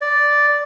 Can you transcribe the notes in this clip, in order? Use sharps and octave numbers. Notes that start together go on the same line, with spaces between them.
D5